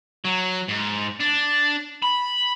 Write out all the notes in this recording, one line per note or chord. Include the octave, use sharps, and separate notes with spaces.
F#3
G#2
D4
B5